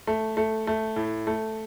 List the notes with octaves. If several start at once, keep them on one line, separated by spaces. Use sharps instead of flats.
A3
A3
A3
A2
A3